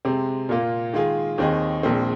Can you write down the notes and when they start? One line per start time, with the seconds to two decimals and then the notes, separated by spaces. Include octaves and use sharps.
0.05 C3 G#3 C4
0.49 A#2 A#3 F4
0.93 D#3 G#3 F4 G#4
1.38 D#2 D#3 C4 G#4 D#5
1.83 A#1 A#2 G#3 C4